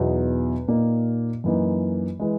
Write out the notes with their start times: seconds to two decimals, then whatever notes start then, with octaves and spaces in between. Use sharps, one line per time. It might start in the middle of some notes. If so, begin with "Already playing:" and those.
Already playing: E2 B2 F#3 B3 D#4
0.68 A#2 A#3 D#4
1.44 F#2 E3 A#3 D#4
2.19 E3 G#3